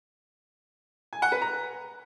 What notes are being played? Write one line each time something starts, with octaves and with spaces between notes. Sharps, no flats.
G#5
F#5
B4
A#5